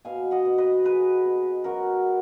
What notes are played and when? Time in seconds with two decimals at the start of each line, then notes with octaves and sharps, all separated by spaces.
0.05 B2 F5 G#5
0.31 D#5 F#5
0.45 B2
0.58 B4 D#5
0.84 F#3 G#4 B4
1.25 B2
1.64 F#2 F#4 A#4